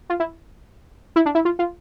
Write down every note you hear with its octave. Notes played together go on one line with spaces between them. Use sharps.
F4
E4
E4
D4
E4
F4
F4